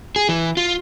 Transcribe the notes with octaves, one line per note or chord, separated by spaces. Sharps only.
G#4
E3
F4